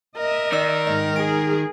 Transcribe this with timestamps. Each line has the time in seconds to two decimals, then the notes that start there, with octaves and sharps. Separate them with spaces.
0.18 A#4 D#5 E5
0.53 D#3 D5 E6
0.87 G#2 D#5
1.16 G#4 D7